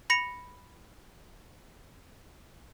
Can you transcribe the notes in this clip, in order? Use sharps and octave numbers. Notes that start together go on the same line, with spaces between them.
B5 A#6 C#7 F7